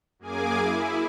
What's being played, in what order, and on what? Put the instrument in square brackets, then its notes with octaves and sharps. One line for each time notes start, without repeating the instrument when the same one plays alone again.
[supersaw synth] F#2 A#3 G#4 G#5 D6
E4